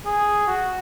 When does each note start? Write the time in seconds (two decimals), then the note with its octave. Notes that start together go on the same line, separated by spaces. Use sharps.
0.06 G#4
0.47 F#4